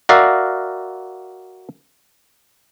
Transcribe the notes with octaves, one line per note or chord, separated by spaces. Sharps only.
F#4 A#4 D5 E5 F5